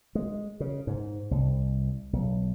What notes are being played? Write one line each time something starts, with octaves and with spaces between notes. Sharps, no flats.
G#3
C#3
G#2
C2
B1